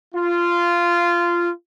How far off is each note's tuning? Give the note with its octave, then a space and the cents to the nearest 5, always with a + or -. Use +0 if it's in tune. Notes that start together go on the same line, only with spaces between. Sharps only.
F4 -15